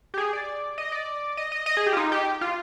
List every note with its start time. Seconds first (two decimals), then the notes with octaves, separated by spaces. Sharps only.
0.14 G4
0.18 G#4
0.33 D5
0.78 D#5
0.92 D5
1.37 D#5
1.52 D#5
1.66 D#5
1.77 G#4
1.86 G4
1.93 F4
1.97 D#4
2.12 G4
2.41 F4